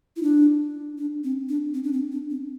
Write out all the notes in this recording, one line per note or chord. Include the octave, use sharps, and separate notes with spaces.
E4
D4
D4
C4
D4
C4
D4
C4
D4
C4